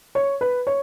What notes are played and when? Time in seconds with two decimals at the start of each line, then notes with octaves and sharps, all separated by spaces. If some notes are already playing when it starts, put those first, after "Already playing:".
0.15 C#5
0.41 B4
0.67 C#5